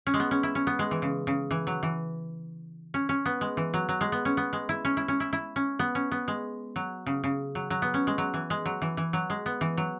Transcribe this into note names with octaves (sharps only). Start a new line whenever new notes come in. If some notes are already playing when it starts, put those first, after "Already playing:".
C#4
G#3
B3
C#4
E4
C#4
B3
G#3
E3
C#3
C#3
E3
F#3
E3
C#4
C#4
B3
G#3
E3
F#3
F#3
G#3
B3
C#4
B3
G#3
E4
C#4
E4
C#4
E4
E4
C#4
B3
C#4
B3
G#3
F#3
C#3
C#3
F#3
F#3
B3
C#4
G#3
F#3
E3
G#3
F#3
E3
E3
F#3
G#3
B3
E3
F#3